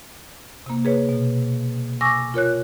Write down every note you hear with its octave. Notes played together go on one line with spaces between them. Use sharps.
C3 A#3
G#4 B4 C#5
B2
G#5 C#6 D6 E6 A#6
F4 A#4 C#5 F#6